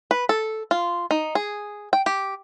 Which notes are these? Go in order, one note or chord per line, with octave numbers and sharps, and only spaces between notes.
B4
A4
F4
D#4
G#4
G5
G4